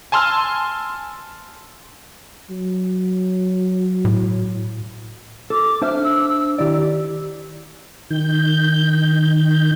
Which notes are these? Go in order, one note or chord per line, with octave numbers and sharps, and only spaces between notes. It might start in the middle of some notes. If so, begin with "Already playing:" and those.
G#5 A5 C6 E6 F6
F#3
A2
A4 D6
D4 C5 E5 F6
E6
D#3 E4 G4 D5
D#3 G6